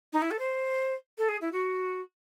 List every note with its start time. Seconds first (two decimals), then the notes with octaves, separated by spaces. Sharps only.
0.13 D#4
0.22 E4
0.31 A4
0.39 C5
1.18 A4
1.28 G#4
1.41 E4
1.52 F#4